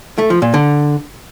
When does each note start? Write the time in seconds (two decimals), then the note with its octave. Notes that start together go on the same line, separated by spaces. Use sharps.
0.18 A3
0.30 F3
0.42 A#2
0.54 D3